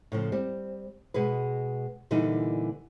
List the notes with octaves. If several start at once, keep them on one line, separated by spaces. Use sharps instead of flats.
A2 C#3 F3
G3 C4
B2 G#3 G#4 B4
A#2 D3 E3 G3 D#4